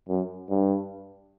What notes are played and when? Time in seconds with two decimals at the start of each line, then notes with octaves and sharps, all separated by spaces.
0.09 F#2
0.49 G2